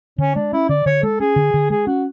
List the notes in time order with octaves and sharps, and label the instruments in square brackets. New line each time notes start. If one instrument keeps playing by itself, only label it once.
[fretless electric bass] D3 [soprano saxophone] C#4
[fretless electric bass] G#3 [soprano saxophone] D4
[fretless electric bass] C#4 [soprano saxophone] E4
[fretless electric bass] D3 [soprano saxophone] D5
[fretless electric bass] D3 [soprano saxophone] C#5
[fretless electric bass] G#3 [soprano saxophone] A4
[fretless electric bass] C#4 [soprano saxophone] G#4
[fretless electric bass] D3
D3
[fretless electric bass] G#3 [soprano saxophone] G#4
[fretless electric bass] C#4 [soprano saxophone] F#4